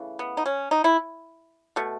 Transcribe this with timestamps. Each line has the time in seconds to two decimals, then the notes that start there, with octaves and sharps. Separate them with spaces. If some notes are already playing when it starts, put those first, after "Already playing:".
Already playing: C#3 E3 A3
0.19 B3
0.37 D#4
0.46 C#4
0.71 D#4
0.84 E4
1.76 B2 A3